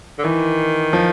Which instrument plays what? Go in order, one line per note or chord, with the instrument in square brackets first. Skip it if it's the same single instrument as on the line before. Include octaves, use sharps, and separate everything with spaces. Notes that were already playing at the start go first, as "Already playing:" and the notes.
[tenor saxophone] D3
[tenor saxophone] D#3 [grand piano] E3
[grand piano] F3